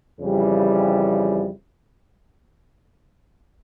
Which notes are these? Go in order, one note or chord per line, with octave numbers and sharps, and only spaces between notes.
F2 C#3 E3 G3